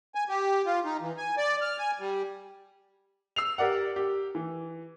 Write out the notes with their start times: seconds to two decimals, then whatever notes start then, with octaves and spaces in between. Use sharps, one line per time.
0.15 G#5
0.29 G4
0.66 F4
0.85 D#4
1.01 E3
1.18 G#5
1.37 D5
1.62 F6
1.78 G#5
1.99 G3
3.36 E6 C7 F7
3.58 G4 A#4 D5 F#5
3.96 G4
4.35 E3